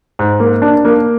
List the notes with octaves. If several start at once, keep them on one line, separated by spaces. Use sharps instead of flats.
G#2
A#3
D4
A#3